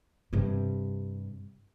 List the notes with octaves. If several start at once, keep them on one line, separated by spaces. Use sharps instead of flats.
G2 C3